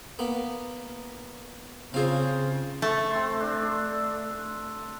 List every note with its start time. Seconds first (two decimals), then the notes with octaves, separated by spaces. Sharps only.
0.19 A#3 B3
1.94 C#3 C4 F4 G#4 C5 F5
2.82 A3
3.11 C4 C6
3.40 D4